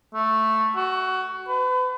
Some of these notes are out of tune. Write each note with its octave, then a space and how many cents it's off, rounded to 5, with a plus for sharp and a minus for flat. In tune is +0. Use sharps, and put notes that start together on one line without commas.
A3 +0
F#4 +20
B4 +40